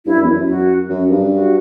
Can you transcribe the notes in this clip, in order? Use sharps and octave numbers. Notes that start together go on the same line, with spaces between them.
G2 E4
F#2
E2
F#2
F#4
F#2
G2
F#4